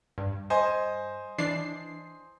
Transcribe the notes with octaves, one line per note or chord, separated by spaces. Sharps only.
G2
C5 D#5 G#5
E3 D4 C7